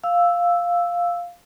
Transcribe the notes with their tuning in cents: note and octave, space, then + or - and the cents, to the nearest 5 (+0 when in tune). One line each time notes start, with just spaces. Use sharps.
F5 +0 E6 +0